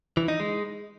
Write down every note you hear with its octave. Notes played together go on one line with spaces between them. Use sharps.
E3
D#4
G#3